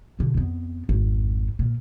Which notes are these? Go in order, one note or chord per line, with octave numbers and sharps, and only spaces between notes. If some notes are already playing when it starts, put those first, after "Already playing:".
B2 D3
F2 B3
G#1 F2
A#2